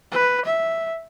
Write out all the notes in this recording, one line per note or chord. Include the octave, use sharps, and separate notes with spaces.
B4
E5